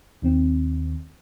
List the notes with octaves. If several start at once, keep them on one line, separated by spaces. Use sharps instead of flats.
D#2 D#3 C4